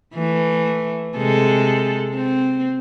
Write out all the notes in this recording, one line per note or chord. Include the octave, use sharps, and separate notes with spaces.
E3 A3
C3 G#3 A4
C4